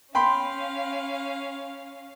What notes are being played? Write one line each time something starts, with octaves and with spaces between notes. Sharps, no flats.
C#4 F5 G5 B5 C6